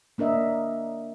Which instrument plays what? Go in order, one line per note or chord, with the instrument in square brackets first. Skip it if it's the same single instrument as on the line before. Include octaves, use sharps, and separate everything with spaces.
[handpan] A#3 D4 A#4 D#5 E5